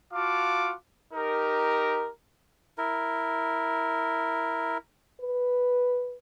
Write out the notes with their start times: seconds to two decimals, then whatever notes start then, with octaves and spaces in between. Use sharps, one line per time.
0.12 F4 F#4 F5 A5 D6
1.14 D#4 G4 A#4
2.78 E4 A#4
5.21 B4